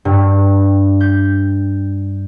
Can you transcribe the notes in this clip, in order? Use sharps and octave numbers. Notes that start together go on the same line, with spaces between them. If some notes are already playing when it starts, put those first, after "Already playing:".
G2
G6